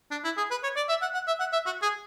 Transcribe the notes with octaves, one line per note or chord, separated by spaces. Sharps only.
D4
E4
G#4
B4
C#5
D5
E5
F#5
F#5
E5
F#5
E5
F#4
G#4